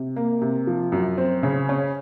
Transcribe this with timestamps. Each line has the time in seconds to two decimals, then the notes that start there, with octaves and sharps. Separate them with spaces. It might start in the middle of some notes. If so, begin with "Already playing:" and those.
Already playing: C3
0.16 A#3
0.42 C3
0.67 F3
0.92 F#2
1.18 C4
1.43 C#3
1.69 C#4